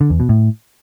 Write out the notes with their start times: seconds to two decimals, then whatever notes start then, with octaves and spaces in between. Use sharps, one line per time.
0.01 D3
0.10 E2
0.20 B2
0.29 A2